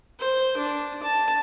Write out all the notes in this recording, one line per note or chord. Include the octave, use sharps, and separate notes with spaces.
C5
D4
A5